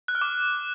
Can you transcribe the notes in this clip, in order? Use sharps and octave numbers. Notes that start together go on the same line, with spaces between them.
F#6
F6
D6